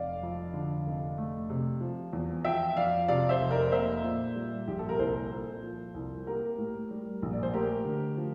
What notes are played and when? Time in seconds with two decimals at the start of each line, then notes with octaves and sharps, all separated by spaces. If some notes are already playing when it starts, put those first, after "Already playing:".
Already playing: F1 D5 F5
0.23 F2
0.54 D3
0.86 F1
1.18 A3
1.50 C3
1.81 F3
2.13 E2
2.44 F3 E5 G5
2.77 F2 D5 F5
3.08 C3 D5 F5
3.29 C5 E5
3.41 F1
3.51 A#4 D5
3.72 A#3 C5 E5
4.03 A#2
4.35 G3
4.68 A#1 G4
4.79 A4
4.89 A#4
4.99 C2 A4 C5
5.32 A#2
5.63 F3
5.94 C2
6.27 A#3 G4 A#4
6.58 A2
6.91 G3
7.22 A#1
7.33 D5
7.43 C5
7.53 A3 G4 A#4
7.85 D3
8.17 F3